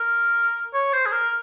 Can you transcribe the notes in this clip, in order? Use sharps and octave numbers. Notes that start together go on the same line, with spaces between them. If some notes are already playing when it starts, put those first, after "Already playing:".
Already playing: A#4
C#5
C5
G#4
A#4